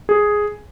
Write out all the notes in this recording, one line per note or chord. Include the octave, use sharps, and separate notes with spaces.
G#4